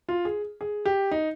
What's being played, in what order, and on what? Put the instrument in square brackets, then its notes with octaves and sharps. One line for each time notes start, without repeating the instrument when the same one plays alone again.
[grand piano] F4
G#4
G#4
G4
D#4